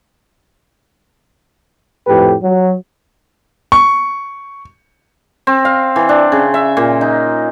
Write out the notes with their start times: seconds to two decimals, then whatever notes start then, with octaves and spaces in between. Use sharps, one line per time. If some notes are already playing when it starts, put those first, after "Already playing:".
2.07 F2 A2 G4 B4
2.43 F#3
3.72 C#6
5.47 C4
5.65 F5
5.96 E3
6.09 D4
6.32 C#3
6.54 E5
6.77 A#2
7.01 D#4